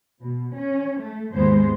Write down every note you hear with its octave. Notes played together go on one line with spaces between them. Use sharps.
B2
C#4
A3
D#2 G#2 G#3 B3 C5